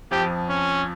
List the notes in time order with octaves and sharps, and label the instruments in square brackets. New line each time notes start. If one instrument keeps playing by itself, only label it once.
[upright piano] F2 F3 [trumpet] G4
[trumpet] C#4